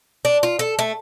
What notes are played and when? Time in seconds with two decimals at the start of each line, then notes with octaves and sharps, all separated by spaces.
0.25 D4
0.43 F4
0.59 A4
0.79 A3